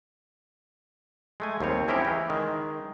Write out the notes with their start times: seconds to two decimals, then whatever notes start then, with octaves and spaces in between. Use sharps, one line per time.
1.40 G#3 A3 G#5
1.60 D#2 G3 C4 C#5
1.88 C4 C#4 E4 G4 G#4 A#4
2.05 E3
2.30 D#3 G#3